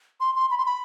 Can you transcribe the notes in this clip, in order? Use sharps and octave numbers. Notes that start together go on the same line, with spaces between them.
C6
C6
B5
C6
B5